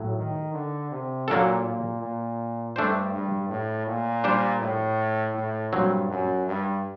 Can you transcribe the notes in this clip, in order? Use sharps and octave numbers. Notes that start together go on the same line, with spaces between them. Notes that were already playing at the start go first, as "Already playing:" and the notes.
Already playing: A2 F#3
D#3
D3
C3
A#2 F#3 A#3 D4 A4
A#2
A#2
G2 A3 D4 G4 C5
G2
A2
A#2
G3 D4 G4 C5
A2
A2
G2 A#2 F#3 C4
F#2
G2